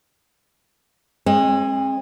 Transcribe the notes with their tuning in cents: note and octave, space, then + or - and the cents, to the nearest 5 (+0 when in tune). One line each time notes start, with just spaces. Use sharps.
G#3 +0 C4 +45